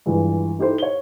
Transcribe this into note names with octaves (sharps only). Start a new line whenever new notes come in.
G2 E3 F3 G#3
D#4 E4 G4 A4 C5
C#5 G7